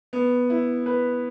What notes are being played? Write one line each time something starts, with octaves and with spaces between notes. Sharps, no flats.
B3
E4
B4